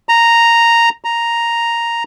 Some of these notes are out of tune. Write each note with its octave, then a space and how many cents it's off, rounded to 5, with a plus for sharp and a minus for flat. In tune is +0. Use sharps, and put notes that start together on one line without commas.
A#5 -5
A#5 +0